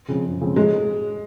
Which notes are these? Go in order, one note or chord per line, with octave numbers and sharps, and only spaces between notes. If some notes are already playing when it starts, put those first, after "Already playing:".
C#3 F3 G#3 C4
F#2
C#3 F3 G#3 C4
A2 G#3